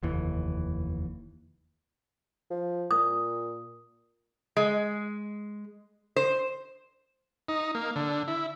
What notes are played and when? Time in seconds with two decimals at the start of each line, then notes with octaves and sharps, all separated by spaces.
0.03 F1 D#2 E3
2.50 F3
2.91 A#2 D#6
4.57 G#3
6.16 C5
7.49 D#4
7.75 A#3
7.96 D3
8.28 E4